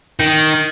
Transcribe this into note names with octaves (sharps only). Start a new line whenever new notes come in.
D#3